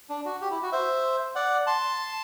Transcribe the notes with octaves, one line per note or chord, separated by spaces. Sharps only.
D4
F#4
G4
E4
F#4
C5 E5
D5 F#5
A5 C6